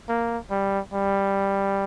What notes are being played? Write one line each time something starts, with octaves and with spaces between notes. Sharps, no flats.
A#3
G3
G3